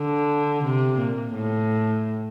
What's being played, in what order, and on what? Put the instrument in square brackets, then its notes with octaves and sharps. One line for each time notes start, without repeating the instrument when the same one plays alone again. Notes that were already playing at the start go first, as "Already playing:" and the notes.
Already playing: [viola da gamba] D3
C3
A#2
A2